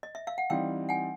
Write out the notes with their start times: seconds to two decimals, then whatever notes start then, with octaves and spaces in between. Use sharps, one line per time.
0.03 D#5
0.15 E5
0.27 F5
0.38 F#5
0.50 E3 G3 C4 D#4 F5 G5
0.89 F#5 G#5